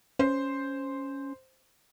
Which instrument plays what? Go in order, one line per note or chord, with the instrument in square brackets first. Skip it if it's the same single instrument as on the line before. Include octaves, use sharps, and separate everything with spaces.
[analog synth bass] C#4 [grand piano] C5